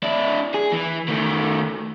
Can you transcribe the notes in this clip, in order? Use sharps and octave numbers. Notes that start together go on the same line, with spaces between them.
D4 E4
G#4
E3
D#3 A3